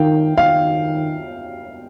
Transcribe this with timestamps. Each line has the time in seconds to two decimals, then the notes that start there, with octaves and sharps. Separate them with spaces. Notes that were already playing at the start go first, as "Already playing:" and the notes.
Already playing: D#3 F5 G5
0.38 D#3 F5